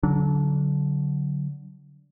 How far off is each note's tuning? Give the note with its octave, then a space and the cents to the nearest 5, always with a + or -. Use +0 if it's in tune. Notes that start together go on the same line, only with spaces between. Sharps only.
D3 -25 F#3 +0 D4 -25